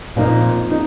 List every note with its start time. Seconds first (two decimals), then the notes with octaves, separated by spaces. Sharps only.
0.16 F2 A#2 F3 A#3 D#4 A#4
0.71 D#4